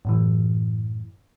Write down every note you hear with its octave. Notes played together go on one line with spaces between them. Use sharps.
F#2 A2 E3